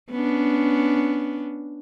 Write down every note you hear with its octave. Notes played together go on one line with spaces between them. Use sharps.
B3 C#4 D4